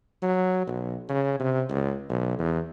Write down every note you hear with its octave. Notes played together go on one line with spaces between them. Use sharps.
F#3
B1
C#3
C3
C#2
B1
E2